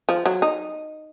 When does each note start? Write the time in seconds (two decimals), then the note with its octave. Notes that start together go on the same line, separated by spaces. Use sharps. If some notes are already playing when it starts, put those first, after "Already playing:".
0.09 F3
0.26 F#3
0.42 D#4